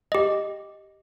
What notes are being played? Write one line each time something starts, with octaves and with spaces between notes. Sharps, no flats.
G4 D#5